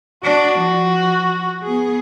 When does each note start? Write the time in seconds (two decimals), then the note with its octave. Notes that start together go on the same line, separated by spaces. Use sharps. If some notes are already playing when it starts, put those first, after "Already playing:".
0.24 D4 F#4
0.59 F3
1.63 B3 G#4